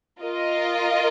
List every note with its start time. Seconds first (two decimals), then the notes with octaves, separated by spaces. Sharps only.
0.21 F4 A#4 D#5